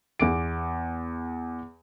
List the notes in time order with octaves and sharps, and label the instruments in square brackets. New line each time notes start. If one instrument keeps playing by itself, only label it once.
[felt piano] E2 D6 D7